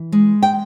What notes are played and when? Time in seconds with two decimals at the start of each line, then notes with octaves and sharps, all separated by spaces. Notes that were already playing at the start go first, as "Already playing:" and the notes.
Already playing: E3
0.12 G#3
0.43 G5